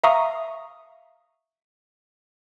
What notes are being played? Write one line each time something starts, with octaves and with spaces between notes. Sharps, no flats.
E5 F5 A#5 C#6 D#6